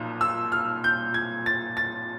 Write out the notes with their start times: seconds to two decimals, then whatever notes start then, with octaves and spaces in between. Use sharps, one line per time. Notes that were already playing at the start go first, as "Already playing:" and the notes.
Already playing: B1 A#2 F3
0.21 E6
0.52 F6
0.84 G6
1.14 G#6
1.46 A6
1.77 A6